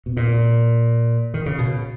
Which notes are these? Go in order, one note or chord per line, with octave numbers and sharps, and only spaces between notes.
B2
A#2
D#3
C#3
B2